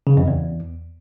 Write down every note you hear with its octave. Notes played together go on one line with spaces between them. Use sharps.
C#3
F2
E2